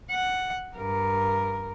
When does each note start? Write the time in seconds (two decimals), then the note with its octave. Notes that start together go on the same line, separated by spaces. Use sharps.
0.11 F#5
0.77 G2 A#4